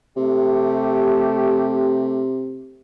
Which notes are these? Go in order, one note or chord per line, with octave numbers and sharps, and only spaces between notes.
C3 A3 G4